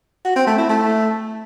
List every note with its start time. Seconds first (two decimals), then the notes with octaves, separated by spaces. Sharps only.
0.25 F#4
0.36 C4
0.47 A3
0.58 E4
0.69 A3